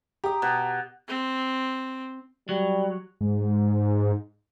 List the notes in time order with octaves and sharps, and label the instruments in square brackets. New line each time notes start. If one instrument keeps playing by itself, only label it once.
[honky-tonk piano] G4 [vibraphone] A#5 D#6
[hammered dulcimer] B2
[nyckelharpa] C4
[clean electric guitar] F#3 [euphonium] G3
[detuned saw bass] G#2